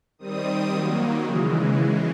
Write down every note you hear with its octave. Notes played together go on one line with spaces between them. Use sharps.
D#3 G3 C4 D#6
D#3 F#3 A#3
C#3 E3 G#3